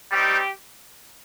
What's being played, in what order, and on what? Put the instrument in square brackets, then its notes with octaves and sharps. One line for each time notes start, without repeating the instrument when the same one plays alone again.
[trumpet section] G3 C4 D#4 G4